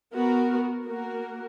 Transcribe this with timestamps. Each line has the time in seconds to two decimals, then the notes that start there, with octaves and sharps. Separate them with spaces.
0.13 B3 F#4 A#4
0.85 A#3 F#4 A#4